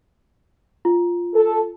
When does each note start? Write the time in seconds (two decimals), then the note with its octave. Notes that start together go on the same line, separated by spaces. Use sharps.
0.85 F4
1.34 A4